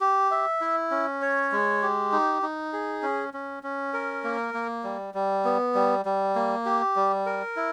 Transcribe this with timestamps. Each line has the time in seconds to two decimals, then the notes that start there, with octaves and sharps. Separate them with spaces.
0.01 G4
0.31 E5
0.61 E4
0.91 C#4
1.22 C#5
1.52 G#3
1.82 G4
2.12 D#4
2.42 D#4
2.73 G#4
3.03 C#4
3.34 C#4
3.63 C#4
3.94 A#4
4.24 A#3
4.54 A#3
4.84 G3
5.14 G3
5.45 B3
5.75 G3
6.05 G3
6.36 A#3
6.66 G4
6.96 G3
7.26 A#4
7.57 E4